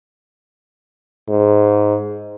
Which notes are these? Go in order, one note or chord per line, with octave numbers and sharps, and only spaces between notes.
G#2